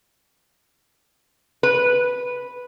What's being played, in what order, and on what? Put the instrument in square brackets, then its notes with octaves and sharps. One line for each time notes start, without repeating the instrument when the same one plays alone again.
[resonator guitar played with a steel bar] B4